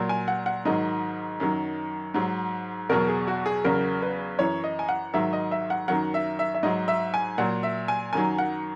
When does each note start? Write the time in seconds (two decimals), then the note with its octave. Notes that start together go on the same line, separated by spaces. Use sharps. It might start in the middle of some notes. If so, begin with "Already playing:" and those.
Already playing: A#2 F#3
0.09 G#5
0.28 F#5
0.46 F#5
0.65 G#2 D#3 F#3 D#5
1.40 F#2 D#3 F#3
2.14 G#2 F#3
2.89 E2 B2 F#3 A#4
3.08 G#4
3.28 F#4
3.46 G#4
3.64 E2 C#3 F#3 A#4
4.02 B4
4.39 F#2 E3 C#5
4.64 D#5
4.79 G#5
4.89 F#5
5.14 G#2 D#3 F#3 E5
5.33 D#5
5.51 E5
5.70 F#5
5.88 F#2 D#3 F#3 F#5
6.14 E5
6.39 E5
6.54 E5
6.63 G#2 F#3 D#5
6.88 E5
7.14 G#5
7.38 A#2 F#3 F#5
7.63 E5
7.88 G#5
8.13 F#2 D#3 F#3 G#5
8.38 F#5